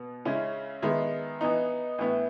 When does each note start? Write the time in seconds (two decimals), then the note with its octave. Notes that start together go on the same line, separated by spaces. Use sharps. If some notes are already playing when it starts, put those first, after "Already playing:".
Already playing: B2 B3
0.25 C#3 G#3 C#4 E4
0.82 D#3 G#3 B3 E4
1.41 E3 B3 D#4
1.98 A2 E3 B3 E4